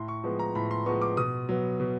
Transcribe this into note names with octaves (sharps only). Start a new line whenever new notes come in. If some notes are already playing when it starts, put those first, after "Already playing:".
Already playing: A2 C6
C#6
F3 G#3 B3
A#5
A2 B5
C6
F3 G#3 B3 C#6
D6
B2 D#6
F#3 B3
B2